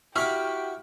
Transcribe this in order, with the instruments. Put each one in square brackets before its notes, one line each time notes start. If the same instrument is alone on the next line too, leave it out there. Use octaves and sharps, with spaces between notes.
[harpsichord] E4 B5 D6 [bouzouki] F#4 [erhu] G4 [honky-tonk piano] F6